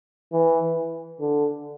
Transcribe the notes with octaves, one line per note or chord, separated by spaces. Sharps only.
E3
D3